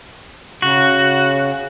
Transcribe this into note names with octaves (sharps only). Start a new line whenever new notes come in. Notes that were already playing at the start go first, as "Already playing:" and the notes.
C#3 F#4